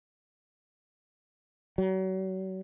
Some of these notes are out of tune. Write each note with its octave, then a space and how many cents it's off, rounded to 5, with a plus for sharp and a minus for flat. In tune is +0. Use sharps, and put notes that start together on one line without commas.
F#3 +35